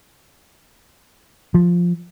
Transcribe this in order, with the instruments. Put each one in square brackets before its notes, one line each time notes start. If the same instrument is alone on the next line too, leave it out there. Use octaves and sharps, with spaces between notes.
[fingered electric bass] F3